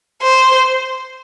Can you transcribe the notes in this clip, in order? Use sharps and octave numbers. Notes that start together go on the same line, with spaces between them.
C5